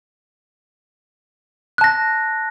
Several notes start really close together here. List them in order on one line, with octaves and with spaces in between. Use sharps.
F#6 A5 A#6